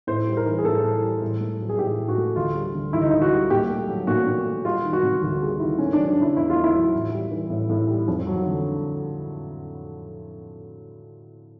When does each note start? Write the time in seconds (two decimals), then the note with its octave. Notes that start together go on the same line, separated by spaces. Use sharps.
0.07 A2 C5
0.27 G3
0.37 A#4
0.46 E3
0.58 G#4
0.65 A2 A4
0.83 A2
1.02 G3
1.22 A2
1.40 A3
1.60 F#3
1.69 G#4
1.79 A2 G4
1.99 A2
2.08 F#4
2.18 A3
2.36 D2 F4
2.55 G3
2.74 D3
2.93 D2 E4
3.02 D#4
3.11 D2 E4
3.21 F#4
3.31 G3
3.50 A#2 G4
3.70 A3
3.88 F#3
4.07 A#2 F#4
4.27 A#2
4.45 A3
4.65 G3 F4
4.84 D#3
4.93 F#4
5.03 C3
5.22 D2 F#4
5.41 G3 G#4
5.60 D#3 E4
5.78 A3 C#4
5.93 F#3 D4
6.07 D4
6.17 C#3 E4
6.36 E2 E4
6.50 F4
6.56 A3
6.64 E4
6.74 F#3
6.93 A2
7.12 G3
7.31 E3
7.50 A2
7.70 A2
7.88 G3
8.08 F2
8.27 F#3
8.46 D3